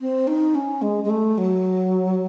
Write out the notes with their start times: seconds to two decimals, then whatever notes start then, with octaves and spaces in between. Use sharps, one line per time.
0.01 C4
0.27 D#4
0.55 C#4
0.82 G#3
1.04 G#3
1.10 A3
1.38 F#3